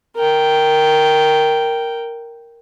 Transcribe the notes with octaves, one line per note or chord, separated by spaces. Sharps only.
A#4 G5